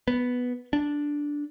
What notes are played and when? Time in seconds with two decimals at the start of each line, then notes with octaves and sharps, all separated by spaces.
0.08 B3
0.73 D4